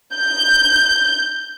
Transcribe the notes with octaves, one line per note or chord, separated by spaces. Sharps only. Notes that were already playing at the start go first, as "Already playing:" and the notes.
G6